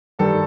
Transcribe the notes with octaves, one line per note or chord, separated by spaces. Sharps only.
G2 D#3 G3 A4